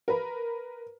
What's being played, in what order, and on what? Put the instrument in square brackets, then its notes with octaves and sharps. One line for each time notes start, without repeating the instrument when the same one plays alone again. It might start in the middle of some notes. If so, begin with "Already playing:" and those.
[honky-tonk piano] A#4 B4